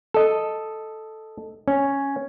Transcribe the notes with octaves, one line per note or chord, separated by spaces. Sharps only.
A4 D#5
C#4